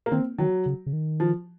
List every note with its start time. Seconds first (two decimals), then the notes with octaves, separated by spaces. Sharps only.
0.06 A#3
0.12 D#3 C4
0.39 D#3 F#3
0.66 C#3
0.86 C#3
0.93 D#3
1.20 F3